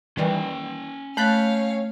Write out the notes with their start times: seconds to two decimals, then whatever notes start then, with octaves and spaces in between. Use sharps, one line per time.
0.17 D#3 E3 G3 C#4 G5
1.17 A3 C#5 F5 B5 F#6 G6 A6 B6